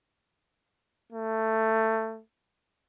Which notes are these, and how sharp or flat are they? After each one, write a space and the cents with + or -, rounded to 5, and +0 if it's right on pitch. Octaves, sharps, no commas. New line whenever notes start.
A3 +15